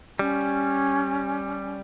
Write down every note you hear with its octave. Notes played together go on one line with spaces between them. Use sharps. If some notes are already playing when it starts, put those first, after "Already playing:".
G3 C#4